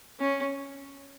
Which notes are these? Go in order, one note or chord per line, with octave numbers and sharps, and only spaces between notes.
C#4